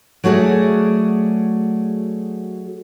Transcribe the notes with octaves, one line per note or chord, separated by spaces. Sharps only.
F#3 A3 F#4 G#4 D5